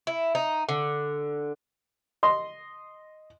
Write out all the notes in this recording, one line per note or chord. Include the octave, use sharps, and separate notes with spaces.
E4
D#4
D3
D#5 C6